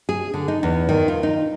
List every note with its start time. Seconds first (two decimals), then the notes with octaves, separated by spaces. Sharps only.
0.09 G#4
0.34 D3
0.48 D#4
0.63 E2
0.89 D#3
1.08 F4
1.23 D#4